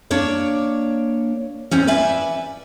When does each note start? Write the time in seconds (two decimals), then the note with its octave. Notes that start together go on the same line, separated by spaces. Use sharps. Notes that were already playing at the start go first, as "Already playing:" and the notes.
0.11 A#3 D4 C#5 D5
1.71 E2 G#2 C4 C#4
1.87 B4 D5 E5 G#5